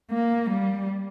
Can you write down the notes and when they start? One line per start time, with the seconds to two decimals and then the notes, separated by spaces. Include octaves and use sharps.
0.11 A#3
0.51 G3